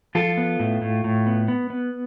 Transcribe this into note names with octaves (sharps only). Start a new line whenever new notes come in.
F3 F4 A4
B3
A2
A2
A2
B3
B3
B3